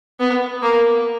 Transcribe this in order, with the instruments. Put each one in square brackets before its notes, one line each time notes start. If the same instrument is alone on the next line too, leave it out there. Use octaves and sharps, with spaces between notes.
[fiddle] B3
A#3